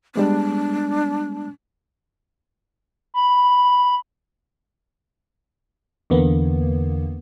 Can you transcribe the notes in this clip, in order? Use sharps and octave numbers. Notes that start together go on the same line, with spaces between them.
G3 G#3 B3 D4
B5
E2 D3 A#3 B3